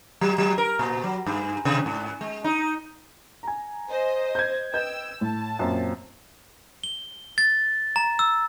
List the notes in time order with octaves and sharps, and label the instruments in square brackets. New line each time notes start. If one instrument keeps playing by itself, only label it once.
[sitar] F#3
F#3
A#4
A#2
F#3
G2
C3
G#2
G#3
D#4
[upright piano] G#5 A#5
[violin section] C5 D#5
[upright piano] G6 G#6
[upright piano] B4 D#5 G6 [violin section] G5 E6
[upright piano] A2 [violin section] A5
[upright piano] F#2 A#2 C4
[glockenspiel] G7
A6
A#5
E6